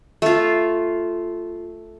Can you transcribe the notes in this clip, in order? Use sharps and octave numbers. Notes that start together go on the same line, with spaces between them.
A3 F4